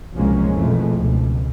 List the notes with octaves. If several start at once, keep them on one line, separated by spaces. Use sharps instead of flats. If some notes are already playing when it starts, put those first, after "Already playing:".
C2 F3 F#3 G#3 A#3 C#4
A#1 F2 B2 E3 G#3 A3
C#2 B2